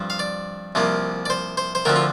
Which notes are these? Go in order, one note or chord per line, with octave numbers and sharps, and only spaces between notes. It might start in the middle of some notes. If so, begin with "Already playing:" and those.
Already playing: G2 F3 C4
F5
D5
C2 C3 F3 A#3
D5
C5
C5
C5
D2 D3 F3 C4 A#4
F4